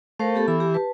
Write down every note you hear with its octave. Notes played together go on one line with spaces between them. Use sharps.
A3 A#4 C5 F5
B3 G4 A4
E3 B5
G4
B4 A5